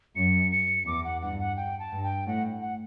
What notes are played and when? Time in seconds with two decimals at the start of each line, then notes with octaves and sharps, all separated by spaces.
0.16 F#2 C#7
0.51 C#7
0.87 E2 D6
1.04 F#5
1.22 G2 F#5
1.39 F#5
1.57 G5
1.79 A5
1.92 G2
2.04 G5
2.26 A2 F#5
2.62 F#5